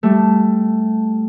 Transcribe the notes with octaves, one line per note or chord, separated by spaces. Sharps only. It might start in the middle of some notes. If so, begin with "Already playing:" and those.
G3 A3